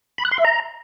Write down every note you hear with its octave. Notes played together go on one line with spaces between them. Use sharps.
B5
F#6
C6
E5
A#5